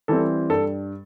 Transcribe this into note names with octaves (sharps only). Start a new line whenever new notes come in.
E3 G3 C4 A4
G2 A4